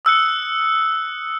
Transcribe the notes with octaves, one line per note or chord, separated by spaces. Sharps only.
D#6 E6 F#6 C#7